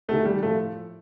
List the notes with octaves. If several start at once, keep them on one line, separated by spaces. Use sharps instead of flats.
D2 C3 D#3 A3
G3
A2 F3 A3